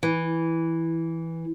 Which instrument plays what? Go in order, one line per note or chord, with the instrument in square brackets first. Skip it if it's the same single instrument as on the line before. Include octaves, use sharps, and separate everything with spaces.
[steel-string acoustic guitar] E3